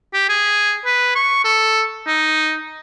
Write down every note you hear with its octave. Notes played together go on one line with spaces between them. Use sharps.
G4
G#4
B4
C#6
A4
D#4